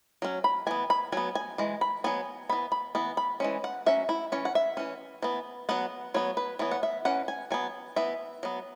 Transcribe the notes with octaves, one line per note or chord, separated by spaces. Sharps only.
F#3 C#4
B5
E3 B3 G#5
B5
F#3 B3 G#5
G#5
E3 G#3
B5
F#3 B3 G#5
E3 B3 B5
B5
E3 B3
B5
E3 G#3 C#4
F#5
F#3 C#4 E5
E4
E3 C#4 C#5
F#5
E5
E3 C#4
E3 B3
F#3 B3 F#5
F#3 B3 C#5
B4
E3 B3 C#5
F#5
E5
E3 C#4 F#5
G#5
F#3 B3 G#5
E3 B3 E5
F#3 B3